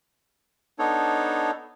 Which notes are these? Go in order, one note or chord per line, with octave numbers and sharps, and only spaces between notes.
B3 D4 D#4 A4 C#5